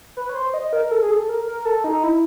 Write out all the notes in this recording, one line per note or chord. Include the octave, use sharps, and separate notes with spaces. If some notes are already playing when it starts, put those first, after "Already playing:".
B4
C#5
C5
D#5
A#4
A#4
A4
G#4
A4
A#4
A#4
A4
D#4
E4